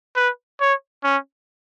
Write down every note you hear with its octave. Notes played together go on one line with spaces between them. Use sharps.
B4
C#5
C#4